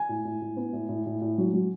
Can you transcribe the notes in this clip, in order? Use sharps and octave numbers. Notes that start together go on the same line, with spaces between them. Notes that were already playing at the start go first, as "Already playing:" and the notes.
Already playing: G#5
A2
A2
A2
B3
A2
A2
A2
A2
F#3
F#3